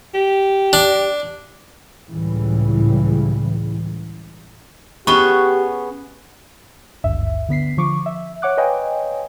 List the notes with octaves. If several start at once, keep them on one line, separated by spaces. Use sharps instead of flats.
G4
D4
C#2 A2 C#3 E3 G3
B3 C#4 G4 G#4 C#6 G7
G#1 D2 G2 E5
D3 B3 B6 C7
D3 F3 C#6 D6
E5
C#5 F#5 D6 F#6
B4 C#5 D#5 F5 G5 G#5